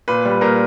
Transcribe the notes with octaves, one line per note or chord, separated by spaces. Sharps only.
A#2 B4
G3
B4
A#2 A#4